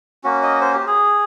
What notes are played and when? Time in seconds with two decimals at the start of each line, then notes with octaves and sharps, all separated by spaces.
0.24 A#3 C#4 F#4
0.43 D#5
0.61 C5
0.74 G4
0.87 G#4